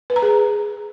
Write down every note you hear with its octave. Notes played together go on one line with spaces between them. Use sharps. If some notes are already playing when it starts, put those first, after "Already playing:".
B4
A#5
G#4